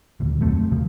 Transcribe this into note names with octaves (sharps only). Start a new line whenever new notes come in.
D#1 D2
F2 F#3 A3 C4
D#2 C3 F3